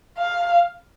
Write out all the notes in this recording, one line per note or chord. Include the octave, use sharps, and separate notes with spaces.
F5